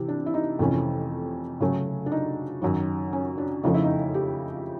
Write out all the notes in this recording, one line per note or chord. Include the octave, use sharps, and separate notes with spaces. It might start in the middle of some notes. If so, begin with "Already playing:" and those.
Already playing: C3 E3 G4
D4
E4
D#4
F2 C3 E3 A3 C#4
C#3 F#3 A3 C#4
D4
D#4
F#2 D#3 F#3
C#4
D4
F2 C#3 F3 A3 D#4
E4
D#4
G4